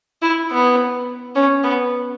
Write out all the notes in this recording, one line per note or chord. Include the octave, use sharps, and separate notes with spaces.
E4
B3
C#4
B3